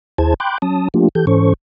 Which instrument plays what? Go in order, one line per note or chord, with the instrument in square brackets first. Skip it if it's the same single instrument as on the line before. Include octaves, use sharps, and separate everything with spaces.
[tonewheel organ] D#2 E4 G#4 C5 A5 G#6
G5 B5 C6 D6 F#6 G6
F#3 C#4 A5 D#6
F3 A3 A#3 D4 F4 G4
E3 G4 A4 G6
G#2 E3 C#4 A4 C5 C#6